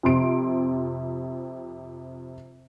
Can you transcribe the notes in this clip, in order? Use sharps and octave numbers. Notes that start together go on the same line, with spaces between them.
F2 C3 C6 D7